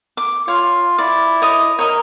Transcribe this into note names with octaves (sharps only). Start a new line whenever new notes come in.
D6
F4 C#5
E4 D5
C#5 D#5 D#6
A#4 C#5 D#5